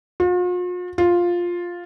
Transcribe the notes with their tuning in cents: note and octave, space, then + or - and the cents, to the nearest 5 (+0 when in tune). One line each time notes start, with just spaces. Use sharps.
F4 +45
F4 +5